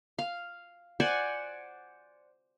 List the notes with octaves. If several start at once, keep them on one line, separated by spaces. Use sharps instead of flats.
F5
C5 D5 F#5 G#5